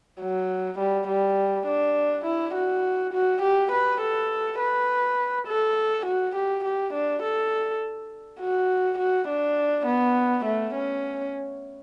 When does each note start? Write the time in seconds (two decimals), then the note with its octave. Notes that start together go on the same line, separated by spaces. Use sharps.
0.20 F#3
0.79 G3
1.08 G3
1.67 D4
2.25 E4
2.54 F#4
3.13 F#4
3.42 G4
3.72 B4
4.01 A4
4.59 B4
5.48 A4
6.06 F#4
6.36 G4
6.65 G4
6.94 D4
7.23 A4
8.40 F#4
8.99 F#4
9.28 D4
9.87 B3
10.45 A3
10.75 C#4